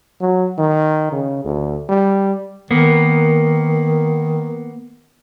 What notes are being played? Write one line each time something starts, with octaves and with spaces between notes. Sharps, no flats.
F#3
D#3
C#3
D2
G3
D#3 A#3 B3